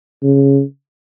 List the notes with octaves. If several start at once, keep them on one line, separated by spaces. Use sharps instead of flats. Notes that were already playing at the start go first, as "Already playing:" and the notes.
C#3